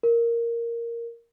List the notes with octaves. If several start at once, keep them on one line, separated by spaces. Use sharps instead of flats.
A#4